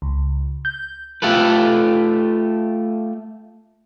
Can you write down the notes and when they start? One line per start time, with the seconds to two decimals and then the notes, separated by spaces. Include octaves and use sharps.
0.02 C#2
0.65 G6
1.22 A3 F4 G4 A4 B4